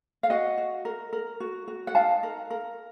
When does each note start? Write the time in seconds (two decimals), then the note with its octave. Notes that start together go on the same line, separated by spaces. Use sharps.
0.23 F5
0.30 F#4 D#5 F#5
0.58 F#4
0.85 A#4
1.13 A#4
1.40 F#4
1.68 F#4
1.87 F#5
1.95 D#4 F5 A5
2.23 A#4
2.50 A#4